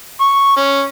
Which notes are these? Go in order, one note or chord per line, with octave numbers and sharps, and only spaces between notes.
C#6
C#4